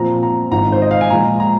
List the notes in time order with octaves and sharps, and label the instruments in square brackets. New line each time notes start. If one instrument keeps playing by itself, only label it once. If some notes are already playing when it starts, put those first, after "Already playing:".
Already playing: [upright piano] A#2 F3 C4 A#5
A#5
G#1 G#2 G#3 F4 A#5
C5
D#5
F5
G#5
A#2 F3 G#3 F4 A#5
A#5